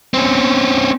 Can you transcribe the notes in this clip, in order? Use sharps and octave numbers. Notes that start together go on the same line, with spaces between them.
C4 C#4